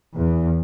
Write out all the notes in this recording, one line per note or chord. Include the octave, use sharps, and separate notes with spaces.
E2